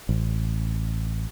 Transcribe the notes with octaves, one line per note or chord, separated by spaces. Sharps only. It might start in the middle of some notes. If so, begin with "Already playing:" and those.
A1